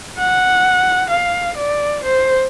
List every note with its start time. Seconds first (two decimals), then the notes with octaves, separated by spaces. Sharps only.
0.18 F#5
1.10 F5
1.57 D5
2.04 C5